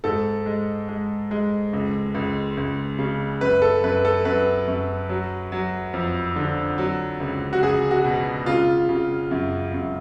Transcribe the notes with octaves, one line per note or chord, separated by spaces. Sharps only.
G#2 A4
G#3
G#3
G#3
C#2
C#2
C#2
C#3
F#2 B4
A4
F#2 B4
A4
F#2 B4
F#2
F#3
F#3
F2
D3
F#3
C#2
F#4
C#2 G#4
F#4
B2
C#3 F4
C#3
F#2
F#2